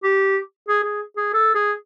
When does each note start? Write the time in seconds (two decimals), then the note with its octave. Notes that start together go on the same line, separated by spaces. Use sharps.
0.04 G4
0.68 G#4
0.84 G#4
1.17 G#4
1.34 A4
1.55 G#4